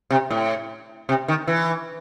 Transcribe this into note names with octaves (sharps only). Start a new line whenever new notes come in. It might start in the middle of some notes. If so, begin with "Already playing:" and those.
C3
A2
C3
D#3
E3